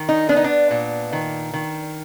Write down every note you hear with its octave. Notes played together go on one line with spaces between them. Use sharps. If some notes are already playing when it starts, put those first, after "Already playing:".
Already playing: D#3
D#4
B3 D4
D#4
D4
A#2
D#3
D#3